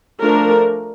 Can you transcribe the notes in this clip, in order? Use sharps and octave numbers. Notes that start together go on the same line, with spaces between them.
F3 A3 D4 A#4